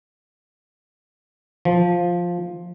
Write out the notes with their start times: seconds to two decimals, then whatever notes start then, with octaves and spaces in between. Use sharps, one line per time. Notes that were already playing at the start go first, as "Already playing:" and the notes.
1.65 F3